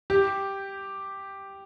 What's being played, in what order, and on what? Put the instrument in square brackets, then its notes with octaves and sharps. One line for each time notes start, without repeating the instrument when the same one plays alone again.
[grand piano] G4